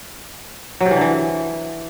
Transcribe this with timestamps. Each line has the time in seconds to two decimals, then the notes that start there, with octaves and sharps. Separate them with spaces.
0.81 F#3
0.86 C3
0.91 E3
0.96 D3
1.01 E3